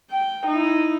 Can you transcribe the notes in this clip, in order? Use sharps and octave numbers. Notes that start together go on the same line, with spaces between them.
G5
D#4 E4